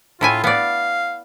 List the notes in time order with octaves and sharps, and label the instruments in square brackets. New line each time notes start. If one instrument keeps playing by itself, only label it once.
[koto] A2 E4 G#5 [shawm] F4
[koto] B3 D5 [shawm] F5